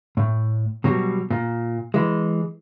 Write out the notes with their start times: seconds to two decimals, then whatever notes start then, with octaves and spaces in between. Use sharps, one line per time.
0.17 A2
0.84 B2 F#3 G3
1.30 A#2
1.94 E3 G#3